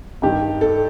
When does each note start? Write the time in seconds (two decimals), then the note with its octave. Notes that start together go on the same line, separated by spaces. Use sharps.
0.22 G2 D#3 G4
0.61 A4